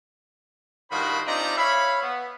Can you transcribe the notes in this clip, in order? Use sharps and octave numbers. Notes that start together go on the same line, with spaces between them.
G2 A#2 D#3 F#4 C5 B5
C4 D4 D#4 F4 G4 A#5
C#5 E5 F5 B5
B3